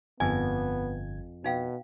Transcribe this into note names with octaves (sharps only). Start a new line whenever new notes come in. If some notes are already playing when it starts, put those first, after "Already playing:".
G1 F2 B3 G#5 G#6
B2 D#4 F5 G5